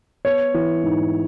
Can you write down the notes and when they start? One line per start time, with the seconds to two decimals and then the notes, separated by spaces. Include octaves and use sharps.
0.25 B3 C#5
0.54 E3
0.83 G#2